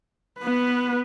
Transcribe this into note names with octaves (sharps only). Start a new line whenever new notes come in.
B3 B4